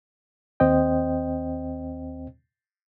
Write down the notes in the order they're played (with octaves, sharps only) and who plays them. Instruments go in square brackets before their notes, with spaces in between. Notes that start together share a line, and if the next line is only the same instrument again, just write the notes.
[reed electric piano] D#2 C4 C5 D#5 G5